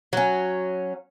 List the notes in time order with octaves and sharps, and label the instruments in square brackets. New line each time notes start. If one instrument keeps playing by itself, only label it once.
[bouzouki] F#3 C#4